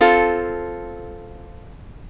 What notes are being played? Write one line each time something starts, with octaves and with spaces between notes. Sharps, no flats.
C4 F4 A4